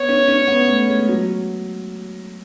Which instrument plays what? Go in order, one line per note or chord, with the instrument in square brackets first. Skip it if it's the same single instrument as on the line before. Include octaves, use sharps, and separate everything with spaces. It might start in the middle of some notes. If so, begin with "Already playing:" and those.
Already playing: [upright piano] B3 [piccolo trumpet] C#5
[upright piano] C#4
C#4
B3
A3
G#3
F#3